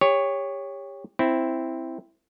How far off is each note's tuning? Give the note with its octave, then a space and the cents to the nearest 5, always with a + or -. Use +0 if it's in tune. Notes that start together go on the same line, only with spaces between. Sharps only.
G4 +30 C#5 +0
C4 +0 E4 +0